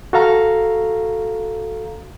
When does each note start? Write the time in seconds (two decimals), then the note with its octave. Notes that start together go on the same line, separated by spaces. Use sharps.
0.13 F#4 A4 F5 A#5